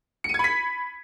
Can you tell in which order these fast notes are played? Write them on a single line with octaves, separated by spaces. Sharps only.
C#7 D#7 G#6 B5 B6